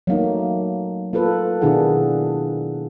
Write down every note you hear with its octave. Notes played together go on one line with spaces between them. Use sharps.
F#3 A3 A#3 D#4
A#3 F4 A4 B4
B2 D#3 D4 E4 G#4 F#5